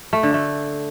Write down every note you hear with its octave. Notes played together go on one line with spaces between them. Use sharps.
A3
D3
A3